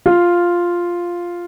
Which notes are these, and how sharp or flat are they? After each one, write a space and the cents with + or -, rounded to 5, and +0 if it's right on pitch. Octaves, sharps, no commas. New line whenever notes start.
F4 +0 F5 +0